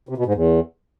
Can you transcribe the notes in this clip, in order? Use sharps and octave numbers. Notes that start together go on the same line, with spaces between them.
C3
B2
G#2
E2